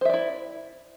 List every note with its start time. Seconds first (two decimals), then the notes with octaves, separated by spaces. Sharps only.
0.01 C5
0.05 E5
0.09 D5
0.13 E4